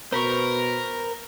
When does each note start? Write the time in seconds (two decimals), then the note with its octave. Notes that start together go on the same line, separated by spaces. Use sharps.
0.12 B2 A#4 C5 B5 C#6